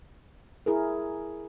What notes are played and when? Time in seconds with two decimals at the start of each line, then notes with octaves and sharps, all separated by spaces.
0.66 E4 G#4 A#4